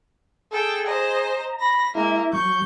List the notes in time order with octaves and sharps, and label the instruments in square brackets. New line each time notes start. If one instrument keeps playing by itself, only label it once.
[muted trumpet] G#4 [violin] A4 G5
[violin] C5 D#5 [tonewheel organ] A#5
[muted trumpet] B5 [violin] A#6
[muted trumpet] G#3 [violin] A#3 [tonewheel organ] E4 E5
[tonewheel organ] F#3 [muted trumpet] C#6 [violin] G6